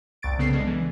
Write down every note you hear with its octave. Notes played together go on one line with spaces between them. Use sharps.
C2 C#6 A6 D7
C#3 B3 A4 C7
G#3 D4
E3